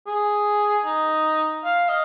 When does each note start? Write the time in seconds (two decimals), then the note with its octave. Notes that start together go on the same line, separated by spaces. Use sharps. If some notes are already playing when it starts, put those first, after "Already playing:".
0.07 G#4
0.85 D#4
1.64 F5
1.89 D#5